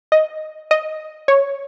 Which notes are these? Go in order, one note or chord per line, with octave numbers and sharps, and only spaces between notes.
D#5
D#5
C#5